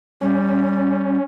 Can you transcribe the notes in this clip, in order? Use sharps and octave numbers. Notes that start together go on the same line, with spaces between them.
G3 C#4